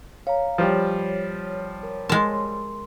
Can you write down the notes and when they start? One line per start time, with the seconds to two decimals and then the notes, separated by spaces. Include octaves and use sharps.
0.27 C#5 F5 A#5
0.58 F3 G3 B4
1.83 A#4
2.09 G#3 A#4 A5 C6